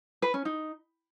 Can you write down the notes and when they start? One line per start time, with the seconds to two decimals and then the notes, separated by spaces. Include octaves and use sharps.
0.22 B4
0.34 C#4
0.45 D#4